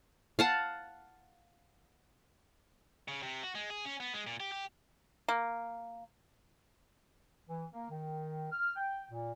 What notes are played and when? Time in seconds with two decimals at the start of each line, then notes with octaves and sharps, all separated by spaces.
0.39 F5 F#5 A5
3.08 C#3
3.23 C3
3.43 F#4
3.55 G#3
3.70 G#4
3.85 C#4
4.00 B3
4.14 G#3
4.27 A#2
4.40 G4
4.52 G4
5.29 A#3
7.48 E3
7.71 A#3
7.89 D#3
8.52 F6
8.76 G5
9.10 A#2